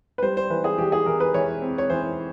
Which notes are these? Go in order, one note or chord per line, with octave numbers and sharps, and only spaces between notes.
B4
G3 C5
C5
E3 B4
G#4
E3 G4
G#4
E3 A#4
B4
E3 C#5
C4
C#5
E3 C5